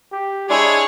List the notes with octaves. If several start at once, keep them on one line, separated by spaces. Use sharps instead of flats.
G4
G#3 D4 E4 G#4 C#5